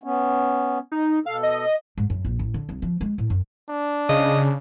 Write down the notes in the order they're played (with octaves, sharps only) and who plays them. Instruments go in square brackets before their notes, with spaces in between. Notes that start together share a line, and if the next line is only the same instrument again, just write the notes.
[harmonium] B3 C#4
[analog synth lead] D#4
[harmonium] B2 A4 [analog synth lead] F5
[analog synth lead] D#5
[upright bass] G#2
F#2
A#1
A1
D3
C2
F3
G#3
A2
F#2
[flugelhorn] D4
[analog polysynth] C#3 [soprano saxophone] D#5